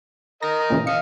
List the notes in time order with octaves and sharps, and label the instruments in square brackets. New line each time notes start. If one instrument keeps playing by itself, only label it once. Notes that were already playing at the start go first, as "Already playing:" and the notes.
[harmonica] A#4 D#5 A#5 [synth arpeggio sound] A#6
[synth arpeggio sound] A#2 C#3 E3
[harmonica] D#5 F5 [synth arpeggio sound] C#7